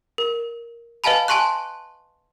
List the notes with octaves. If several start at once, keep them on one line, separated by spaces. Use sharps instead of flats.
A#4
B4 D#5 F5 G#5 A5 B5
G#5 A5 C6 C#6 F#6